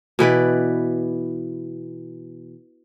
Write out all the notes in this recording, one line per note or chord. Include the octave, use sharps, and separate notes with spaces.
B2 E3 B4 D5